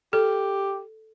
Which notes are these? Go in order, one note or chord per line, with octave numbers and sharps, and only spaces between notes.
G4 A4